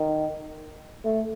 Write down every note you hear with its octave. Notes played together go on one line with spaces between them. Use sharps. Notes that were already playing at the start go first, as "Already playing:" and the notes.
Already playing: D#3
A3